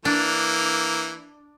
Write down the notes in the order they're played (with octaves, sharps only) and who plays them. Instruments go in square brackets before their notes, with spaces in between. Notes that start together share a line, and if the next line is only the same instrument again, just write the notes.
[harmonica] E3 A#3 [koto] D4